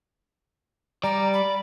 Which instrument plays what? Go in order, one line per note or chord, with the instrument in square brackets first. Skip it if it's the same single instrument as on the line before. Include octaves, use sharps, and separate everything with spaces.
[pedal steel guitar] G3 [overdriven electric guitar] D5 [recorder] A#5
[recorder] B5